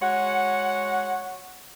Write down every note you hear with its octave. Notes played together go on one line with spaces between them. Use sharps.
G#3 F#4 C#5 F#5